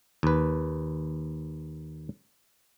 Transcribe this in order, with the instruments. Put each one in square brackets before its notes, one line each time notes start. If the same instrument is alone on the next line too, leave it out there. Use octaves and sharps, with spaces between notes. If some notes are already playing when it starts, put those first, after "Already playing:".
[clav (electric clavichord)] D#2 B4